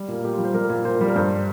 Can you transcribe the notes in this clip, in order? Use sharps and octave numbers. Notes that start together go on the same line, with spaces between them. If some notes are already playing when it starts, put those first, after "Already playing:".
Already playing: G3
A#2 A#3
A#2 G4
F4
G3
C5
G3 A#4
A#2
A#2 C5
G3
A#4
G2 C5